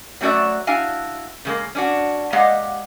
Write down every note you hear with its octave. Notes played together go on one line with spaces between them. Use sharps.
F#3 A3 C#4 F#4 D5 E5
D4 E4 F#4 F5 G#5
C#3 G#3 A#3
C#4 D4 F#4
G#3 A#3 G4 D#5 F5 F#5